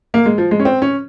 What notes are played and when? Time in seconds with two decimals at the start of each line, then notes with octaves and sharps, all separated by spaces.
0.14 A#3
0.26 G#3
0.38 F3
0.51 G#3
0.60 C#4
0.65 C4
0.82 C#4